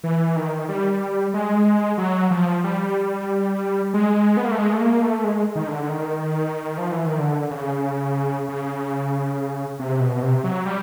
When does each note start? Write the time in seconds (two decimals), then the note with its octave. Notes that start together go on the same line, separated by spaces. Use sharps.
0.04 E3
0.36 D#3
0.69 G3
1.34 G#3
1.98 F#3
2.31 F3
2.64 G3
3.94 G#3
4.37 B3
4.45 A#3
4.51 A3
4.58 G#3
4.73 A3
4.80 A#3
5.02 A3
5.24 G#3
5.55 D#3
5.67 D3
5.89 D#3
6.78 F3
6.92 E3
7.06 D#3
7.19 D3
7.51 C#3
8.48 C#3
9.79 C3
10.00 B2
10.23 C3
10.44 F#3
10.65 G3